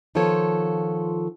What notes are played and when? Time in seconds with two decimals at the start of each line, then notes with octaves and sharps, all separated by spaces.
0.15 D#3 F3 B3 F4 A4 C#5